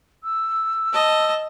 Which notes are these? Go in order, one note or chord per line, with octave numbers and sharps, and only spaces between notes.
E6
D#5 A5